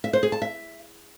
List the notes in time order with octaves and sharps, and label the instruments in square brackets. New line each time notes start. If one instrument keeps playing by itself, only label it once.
[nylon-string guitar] E5
C5
G#4
A5
E5